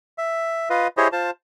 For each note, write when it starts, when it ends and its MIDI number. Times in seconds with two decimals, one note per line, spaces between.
0.18 0.69 76
0.70 0.87 65
0.70 0.87 71
0.70 0.87 75
0.70 0.87 77
0.97 1.08 64
0.97 1.08 67
0.97 1.08 68
0.97 1.08 72
0.97 1.08 73
0.97 1.08 75
1.12 1.30 65
1.12 1.30 72
1.12 1.30 81